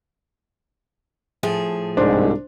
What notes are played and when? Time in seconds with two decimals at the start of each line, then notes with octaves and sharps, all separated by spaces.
1.43 A2 F3 G#4
1.97 C2 G#2 D4 C5